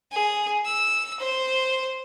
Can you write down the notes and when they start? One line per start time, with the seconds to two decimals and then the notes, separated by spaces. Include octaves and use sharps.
0.12 G#4
0.65 E6
1.20 C5